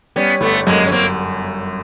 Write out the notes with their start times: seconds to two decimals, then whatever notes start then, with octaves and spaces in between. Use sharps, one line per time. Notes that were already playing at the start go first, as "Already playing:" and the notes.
0.16 G3 B3 C#4
0.41 G1 A3 B3
0.67 F#2 G#3 A#3
0.86 C#4
0.92 A#3 C4